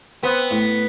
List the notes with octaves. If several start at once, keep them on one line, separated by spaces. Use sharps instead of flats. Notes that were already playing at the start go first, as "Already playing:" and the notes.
B3 C4
A2